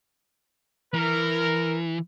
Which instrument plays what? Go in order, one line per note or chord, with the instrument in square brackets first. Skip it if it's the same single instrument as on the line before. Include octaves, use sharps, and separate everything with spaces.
[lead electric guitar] E3 [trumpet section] A#4